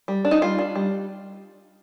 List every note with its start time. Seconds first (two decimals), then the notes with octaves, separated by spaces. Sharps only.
0.08 G3
0.25 D4
0.31 D#4
0.42 G3 F4
0.59 D4
0.76 G3